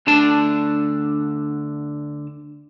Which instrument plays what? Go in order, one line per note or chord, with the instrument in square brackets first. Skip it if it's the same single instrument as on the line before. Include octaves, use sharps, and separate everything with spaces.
[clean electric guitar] D2 D3 D4 A5